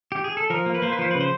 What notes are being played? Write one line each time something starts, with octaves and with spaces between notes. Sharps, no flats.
G4
G#4
A4
F3 A#4
A#3
B4
A#3 C5
B4
F3 C5
C#3 B4
C5